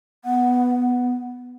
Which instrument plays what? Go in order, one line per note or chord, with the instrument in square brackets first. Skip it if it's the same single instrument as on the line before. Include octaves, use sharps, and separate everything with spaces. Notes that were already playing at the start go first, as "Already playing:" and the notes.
[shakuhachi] B3 [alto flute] F#5